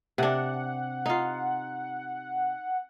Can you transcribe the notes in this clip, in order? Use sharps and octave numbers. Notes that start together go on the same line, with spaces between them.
C3 D4 F#5
D#4 F4